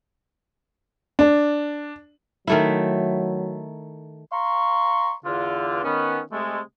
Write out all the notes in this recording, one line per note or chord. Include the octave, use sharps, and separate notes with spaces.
D4
D#3 F#3 A3 E4
F5 A#5 C6 C#6
E2 D3 F4
D#3 B3 C#4
C3 G#3 A3